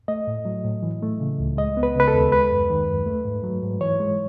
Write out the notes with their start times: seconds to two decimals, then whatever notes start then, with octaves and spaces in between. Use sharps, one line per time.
0.08 A3 D#5
0.27 A2
0.45 F#3
0.65 A2
0.83 E3
1.02 A3
1.20 C#3
1.39 C#2
1.57 G#3 D#5
1.77 B3
1.83 B4
1.95 C#3 B4
2.08 A4
2.14 D#2
2.32 G#3 B4
2.51 F#2
2.70 D#3
2.89 F#2
3.06 A3
3.25 G#2
3.44 F#3
3.63 G#2
3.81 E3 C#5
4.00 G#3